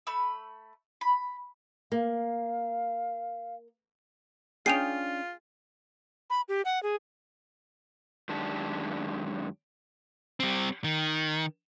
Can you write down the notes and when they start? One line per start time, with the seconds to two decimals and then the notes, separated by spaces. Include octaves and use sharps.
0.07 A3 B5 E6
1.01 B5
1.92 A#3 F5
4.66 C#4 D4 F4 G#4 G5 C7 D#7 F7
6.30 B5
6.49 G4
6.65 F#5
6.83 G#4
8.29 F#2 D#3 G#3 D4 G4 A5
10.40 G3 C4
10.84 D#3